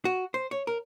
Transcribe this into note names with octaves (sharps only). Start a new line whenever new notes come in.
F#4
C5
C#5
A#4